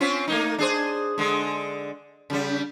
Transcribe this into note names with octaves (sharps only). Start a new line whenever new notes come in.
C4 C#4 F4
A3 A#3 D#4
D4 G#4 C5
D3 G#3
C#3 G3